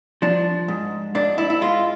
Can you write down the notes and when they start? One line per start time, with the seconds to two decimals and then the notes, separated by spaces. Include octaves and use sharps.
0.22 F3 D4
0.68 G#2
1.15 G#2 D4
1.38 E4
1.50 E4
1.61 G#3 F4